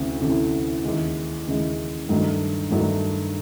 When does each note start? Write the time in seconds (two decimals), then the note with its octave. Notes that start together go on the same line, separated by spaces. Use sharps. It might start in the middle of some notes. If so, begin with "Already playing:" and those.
Already playing: D2 C3 E3 A3 C#4
0.21 D2 C3 E3 A3 C#4
0.84 D#2 C#3 E3 G#3
1.47 D#2 C#3 E3 G#3
2.09 G2 D#3 F#3 A3 D4
2.71 G2 D#3 F#3 A3 D4